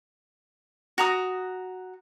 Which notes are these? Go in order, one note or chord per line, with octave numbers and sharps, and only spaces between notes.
F#4 A#5 D#6